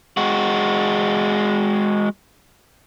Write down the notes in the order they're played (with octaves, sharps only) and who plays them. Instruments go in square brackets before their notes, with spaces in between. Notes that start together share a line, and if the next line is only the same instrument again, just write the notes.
[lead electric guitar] G#3 F#4